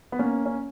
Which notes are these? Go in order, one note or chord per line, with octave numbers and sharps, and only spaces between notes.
B3
A#3 C#4
C#4